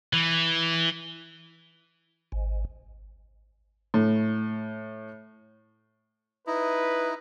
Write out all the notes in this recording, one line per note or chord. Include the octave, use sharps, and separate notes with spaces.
E3
G#1
A2
D#4 E4 B4